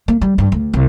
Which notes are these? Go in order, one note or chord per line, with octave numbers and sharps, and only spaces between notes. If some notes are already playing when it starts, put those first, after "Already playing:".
A#3
G3
G2
D2
C2